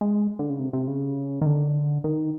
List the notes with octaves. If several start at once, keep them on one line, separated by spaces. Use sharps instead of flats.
G#3
D3
C#3
C3
C3
C#3
D#3
D3
D#3